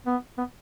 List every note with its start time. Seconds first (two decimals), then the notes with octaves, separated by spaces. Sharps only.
0.07 B3
0.38 B3